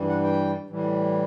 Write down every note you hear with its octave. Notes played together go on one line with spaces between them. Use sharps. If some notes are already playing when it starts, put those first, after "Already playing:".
Already playing: G2 E3 G3
F#5
G5
A2 E3 G3